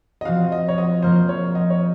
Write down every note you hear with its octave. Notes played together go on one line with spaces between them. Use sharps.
D#5
F3 C4 F#4 F5
D#5
C#5
D#5
F3 A#3 F4 C5
C#5
D#5
C#5